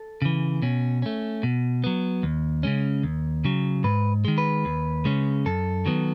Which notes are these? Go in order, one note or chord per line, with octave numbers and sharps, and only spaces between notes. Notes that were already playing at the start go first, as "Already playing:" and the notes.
Already playing: A4
C#3 E3
B2 C#4
A3 C#4
B2
F#3 B3
D#2
C#3 G#3 C#4
D#2
C#3 F#3
G#2 B4
D#3 G#3
B4
D#2
C#3 G#3 C#4
F#2 A4
D#3 F#3 B3